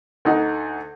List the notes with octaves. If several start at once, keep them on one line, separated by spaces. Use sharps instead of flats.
D2 D#4 F#5